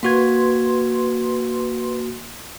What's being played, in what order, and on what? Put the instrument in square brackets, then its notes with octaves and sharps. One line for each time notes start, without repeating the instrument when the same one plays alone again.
[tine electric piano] A#3 F#4 G#6 [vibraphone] B4 C6